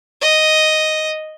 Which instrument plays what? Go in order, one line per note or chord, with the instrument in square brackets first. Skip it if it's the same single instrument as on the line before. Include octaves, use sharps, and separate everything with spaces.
[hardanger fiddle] D#5